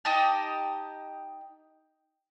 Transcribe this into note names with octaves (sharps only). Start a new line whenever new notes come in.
D#4 G4 D#5 A5